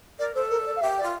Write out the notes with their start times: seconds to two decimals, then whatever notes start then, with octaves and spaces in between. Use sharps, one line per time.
0.19 A#4 D5
0.35 A4 C5
0.50 A#4
0.66 D5
0.76 F5
0.82 G4 E5
0.98 D5
1.03 F4